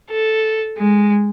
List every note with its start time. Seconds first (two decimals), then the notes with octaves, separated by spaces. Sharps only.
0.10 A4
0.77 G#3